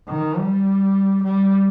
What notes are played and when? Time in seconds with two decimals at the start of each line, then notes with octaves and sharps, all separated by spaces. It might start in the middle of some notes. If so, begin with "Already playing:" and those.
0.08 D#3
0.37 G3
1.24 G3